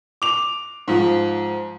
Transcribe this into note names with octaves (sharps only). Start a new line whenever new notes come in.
D6 F7
G#2 F3